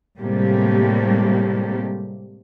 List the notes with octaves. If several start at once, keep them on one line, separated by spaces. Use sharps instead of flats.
A2 C3 G3 G#3 A#3 G4